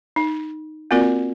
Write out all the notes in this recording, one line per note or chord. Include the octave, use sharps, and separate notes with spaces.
D#4
A#3 C4 F4 F#4 A#4 D5